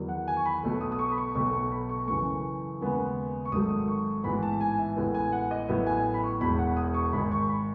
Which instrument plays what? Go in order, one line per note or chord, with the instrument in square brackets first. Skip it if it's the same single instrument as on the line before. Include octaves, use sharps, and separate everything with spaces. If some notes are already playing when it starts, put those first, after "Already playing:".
Already playing: [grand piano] E2 D#3 F#3
F#5
G#5
C#6
B5
B1 B2 A3
D#6
D#6
C#6
B5
C#6
B1 B2 A3 C#6
C#6
B5
C#6
F#2 C#3 E3 A3 C#6
D#2 C#3 G#3 B3
C#6
G#1 G#2 D#3 F#3 A3 D#6
C#6
A1 G#2 E3 B3 B5
A5
G#5
E5
A1 A2 G#3 B3
G#5
F#5
D#5
A1 A2 F#3 B3 E5
G#5
B5
C#6
E1 E2 B2 B5
F#5
D#6
C#6
G#1 G#2 D#3 B5
C#6
B5